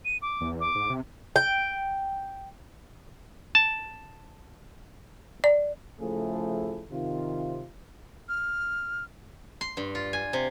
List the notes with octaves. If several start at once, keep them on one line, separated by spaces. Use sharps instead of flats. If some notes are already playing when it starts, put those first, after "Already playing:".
D#7
D6
E2
D6
G#2
C3
G5
A5
D5
C#3 F3 A3 E4 G#4 A4
C3 D#3 F4
F6
C6
G2
F4
G#5
C3